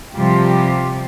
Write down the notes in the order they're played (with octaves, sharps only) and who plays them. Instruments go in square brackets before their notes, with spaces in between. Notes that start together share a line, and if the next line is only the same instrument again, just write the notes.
[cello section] C3 F3 G3 F4 G4